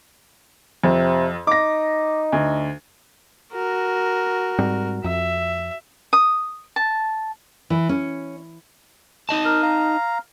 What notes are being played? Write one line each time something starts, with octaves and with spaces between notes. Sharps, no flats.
F2 C3
D#4 D6 A#6
D2
F#4 A#4
G#2 G3 C4
F2 E5
D#6
A5
E3
C#4
D#4 D#5 A5
A#4
F5 A#5